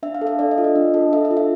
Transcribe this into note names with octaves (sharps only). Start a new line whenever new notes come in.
D4 E5
F5
A4
E5
D4 D5
D#5
F4
D#5
D4
A4
D4 E5
E5
F4
E5